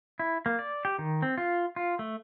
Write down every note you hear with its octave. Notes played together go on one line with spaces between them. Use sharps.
E4
A#3
D5
G4
D#3
C4
F4
F4
A3